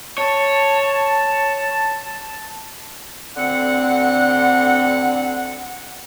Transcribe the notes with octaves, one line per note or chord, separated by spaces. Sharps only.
C#5 A5
D2 D3 C4 F#5